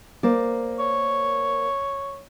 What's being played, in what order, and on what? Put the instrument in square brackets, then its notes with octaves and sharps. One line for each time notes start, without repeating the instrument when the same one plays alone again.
[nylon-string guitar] A#3 C5 D5
[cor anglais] C#5